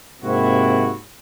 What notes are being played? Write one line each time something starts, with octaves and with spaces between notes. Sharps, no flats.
G#2 C3 A#3 C4 E4 F#4